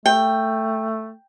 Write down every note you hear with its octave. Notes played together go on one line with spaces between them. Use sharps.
A3 G5